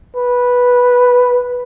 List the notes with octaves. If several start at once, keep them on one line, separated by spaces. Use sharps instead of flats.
B4